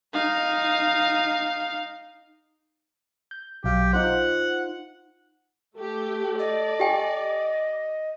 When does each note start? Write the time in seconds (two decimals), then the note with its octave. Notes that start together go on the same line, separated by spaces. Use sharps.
0.14 D#4 F5
3.31 G6
3.64 B1 F#3 G4 F5
3.93 D#4 F4 C5 F#5
5.76 A3 G4 A4
6.39 D5 D#5
6.80 G4 G5 G#5